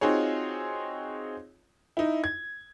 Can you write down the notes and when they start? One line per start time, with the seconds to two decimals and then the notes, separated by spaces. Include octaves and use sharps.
0.01 C4 D#4 F4 F#4 G#4 C#5
1.97 D#4 E4
2.24 G#6